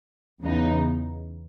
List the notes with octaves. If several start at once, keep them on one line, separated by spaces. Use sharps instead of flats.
E2 C#3 E3 B3 D#4